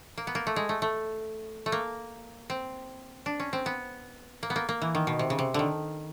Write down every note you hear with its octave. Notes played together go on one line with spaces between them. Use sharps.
A#3
B3
A#3
A3
G#3
A3
A3
A3
A#3
C4
D4
C#4
C4
B3
A#3
B3
A#3
A#3
E3
D#3
B2
C3
C#3
C3
D3 D#3